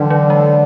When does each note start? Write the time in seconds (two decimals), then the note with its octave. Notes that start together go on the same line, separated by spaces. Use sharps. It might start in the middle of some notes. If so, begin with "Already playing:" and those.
Already playing: D3 E3 F#3
0.10 F#3
0.30 G#3